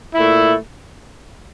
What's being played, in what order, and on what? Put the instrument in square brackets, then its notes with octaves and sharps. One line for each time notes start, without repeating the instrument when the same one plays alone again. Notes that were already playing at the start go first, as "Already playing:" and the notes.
[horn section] A#2 A3 E4